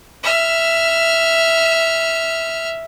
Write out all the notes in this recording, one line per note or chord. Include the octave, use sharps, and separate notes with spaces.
E5 F6